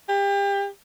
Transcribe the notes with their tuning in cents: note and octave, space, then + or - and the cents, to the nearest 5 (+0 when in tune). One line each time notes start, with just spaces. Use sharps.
G4 +30